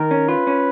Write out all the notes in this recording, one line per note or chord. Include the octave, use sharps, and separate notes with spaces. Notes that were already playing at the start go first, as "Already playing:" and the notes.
Already playing: D#3 A#4
C#4
F4 B4
C#4